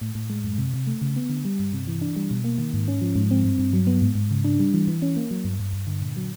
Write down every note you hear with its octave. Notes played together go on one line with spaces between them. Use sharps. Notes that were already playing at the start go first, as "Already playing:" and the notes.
A2
A2
G#3
F#2
C3
C3
A3
C#3
B3
D3
G3
G2
C3
E3
D4
G3
B2
A#3
D#3
G#2
C#4
F3
G#2
C4
G2
G2
F#3
B3
G#2
G#2
C#3
D4
G3
E3
E3
C#4
A#3
F#3
G2
G2
G2
D3
A#2
F#3